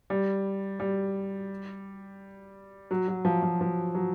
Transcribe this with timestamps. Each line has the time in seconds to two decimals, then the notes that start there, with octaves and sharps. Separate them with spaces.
0.10 G3
0.80 G3
2.91 F#3
3.08 F#3
3.25 F3
3.42 F3
3.61 F3
3.95 F#3